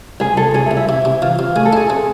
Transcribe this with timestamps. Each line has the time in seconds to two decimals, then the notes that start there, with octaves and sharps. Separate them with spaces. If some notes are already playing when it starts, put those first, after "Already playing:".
0.20 C2 G#4
0.37 C2 A4
0.55 C2 G#4
0.66 E4
0.71 C2
0.77 E4
0.89 C3 E4
1.05 C3
1.22 E3 F4
1.39 C3
1.56 A3 G#4
1.65 A4
1.73 E4 G#4
1.90 C4